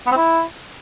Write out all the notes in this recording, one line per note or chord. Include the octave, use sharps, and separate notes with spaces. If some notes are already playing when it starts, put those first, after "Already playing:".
B3
C4
E4